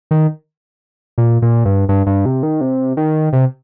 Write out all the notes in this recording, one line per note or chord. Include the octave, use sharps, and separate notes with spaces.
D#3
A#2
A#2
G2
G2
G2
C3
D#3
C3
D#3
C3